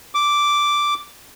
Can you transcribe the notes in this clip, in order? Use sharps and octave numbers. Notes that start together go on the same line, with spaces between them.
D6